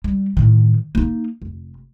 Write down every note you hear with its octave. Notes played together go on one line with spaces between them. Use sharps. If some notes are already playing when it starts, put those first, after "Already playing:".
G3
A2 D#3
A#3 D#4
F1